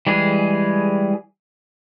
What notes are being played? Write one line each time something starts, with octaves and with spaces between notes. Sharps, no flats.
E3 G3 G#3 G#4